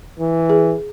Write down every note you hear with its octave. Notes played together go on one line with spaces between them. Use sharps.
E3
G#4